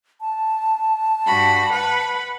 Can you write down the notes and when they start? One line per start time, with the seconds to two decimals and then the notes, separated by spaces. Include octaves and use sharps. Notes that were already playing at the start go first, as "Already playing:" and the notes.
0.21 A5
1.25 G2 F#4 B5
1.71 B4 F#5 B5